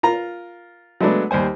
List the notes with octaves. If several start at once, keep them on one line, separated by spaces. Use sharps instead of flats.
F4 A#4 A#5
F#3 G#3 A3 B3 D4
D#2 G3 C5 G#5